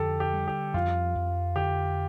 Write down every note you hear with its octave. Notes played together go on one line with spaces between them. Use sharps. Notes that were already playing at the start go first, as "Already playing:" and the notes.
Already playing: F2 D3 G4 A4
G4
G3
G4
F2 F4
F2
D3 G4